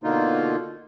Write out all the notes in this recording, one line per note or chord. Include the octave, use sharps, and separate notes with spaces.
B2 D3 A#3 D#4 F4